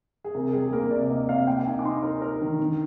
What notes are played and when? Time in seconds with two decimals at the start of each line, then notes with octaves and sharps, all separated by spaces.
0.24 G#4
0.34 C3 A#4
0.53 G3 G#4
0.72 A#3 A#4
0.91 C3 D5
1.10 A#3 D#5
1.29 C3 F5
1.47 A#3 G5
1.66 D#4 G#5
1.79 D6
1.85 D#4 C6
2.03 A#4
2.22 A#4
2.42 D#3
2.60 D#3